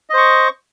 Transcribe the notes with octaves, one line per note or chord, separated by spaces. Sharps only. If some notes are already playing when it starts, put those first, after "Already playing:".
C5 D#5 C#6